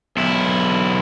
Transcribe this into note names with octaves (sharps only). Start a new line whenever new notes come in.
B1 E4